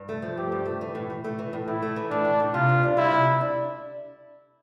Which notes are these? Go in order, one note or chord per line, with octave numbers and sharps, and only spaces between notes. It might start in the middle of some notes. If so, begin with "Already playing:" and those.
Already playing: G2
A3
F3
G2 G4
G2
A3
E3
A2
A2
A3
E3
A2
A2 E4
A3
E3
A2 D4
A2
A3
C3 F4
D2
D4
G3 E4
C3
D2
D4